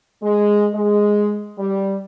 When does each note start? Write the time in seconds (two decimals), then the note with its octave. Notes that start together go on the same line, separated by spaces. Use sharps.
0.23 G#3
0.74 G#3
1.58 G3